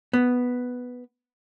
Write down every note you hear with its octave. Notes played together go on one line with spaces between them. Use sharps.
B3